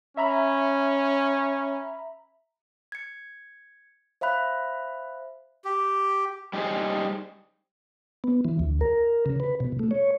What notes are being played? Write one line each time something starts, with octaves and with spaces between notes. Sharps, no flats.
C#4 E5 A#5 B5
G#6 C#7
C5 E5 F5 B5 F#6
G4
G3 D#4 G#4 C5
B3
E3
D2
A#4
C#3
B4
B2
A3
C#5